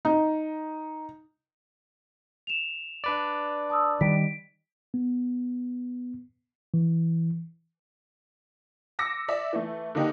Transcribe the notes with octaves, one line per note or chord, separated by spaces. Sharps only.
D#4
E7 F7
D4 B4 D5
A5 D#6 E6
D#3 G3 B6 D7
B3
E3
D6 E6 A#6 C#7
D5 E5
E3 A3
D3 A#3 D#4 G4